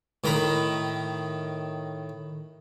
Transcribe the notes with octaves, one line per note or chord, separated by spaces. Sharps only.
A2 D#3 A#5 B5